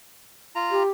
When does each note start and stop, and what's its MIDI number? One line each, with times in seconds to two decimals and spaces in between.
0.55 0.83 65
0.55 0.83 82
0.71 0.89 67